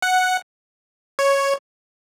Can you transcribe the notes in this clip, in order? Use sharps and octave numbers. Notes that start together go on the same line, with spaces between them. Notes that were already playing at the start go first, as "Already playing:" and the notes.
F#5
C#5